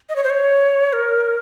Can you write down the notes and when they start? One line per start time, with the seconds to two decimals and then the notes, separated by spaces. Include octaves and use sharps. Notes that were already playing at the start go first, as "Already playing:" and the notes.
0.09 D#5
0.16 C#5
0.24 C5
0.30 C#5
0.93 A#4